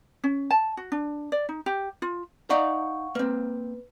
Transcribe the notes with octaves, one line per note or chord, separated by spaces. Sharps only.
C#4
A5
F#4
D4
D5
D#4
G4
F4
D#4 D5 F5 F#5 A#5 C#6
A#3 C4 B4